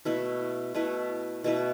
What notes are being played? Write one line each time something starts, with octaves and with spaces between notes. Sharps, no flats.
B2 A3 E4 B4
B2 A3 E4 B4
B2 A3 E4 B4